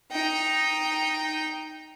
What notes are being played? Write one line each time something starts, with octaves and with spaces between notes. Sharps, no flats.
D#4 G5